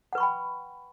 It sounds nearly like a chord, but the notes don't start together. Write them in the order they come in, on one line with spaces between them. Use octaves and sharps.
F#5 B4 C#6 B5 G5